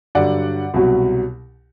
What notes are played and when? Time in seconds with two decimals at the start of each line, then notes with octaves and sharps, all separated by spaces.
0.15 G2 D3 F#3 D5 F#5
0.74 C2 B2 F#3